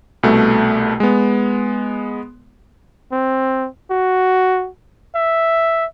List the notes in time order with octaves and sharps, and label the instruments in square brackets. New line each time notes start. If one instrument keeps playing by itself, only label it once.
[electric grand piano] C2 B2 A3
G#3 B3
[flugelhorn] C4
F#4
E5